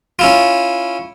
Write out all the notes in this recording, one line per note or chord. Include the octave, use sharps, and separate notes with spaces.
C#4 E4 F4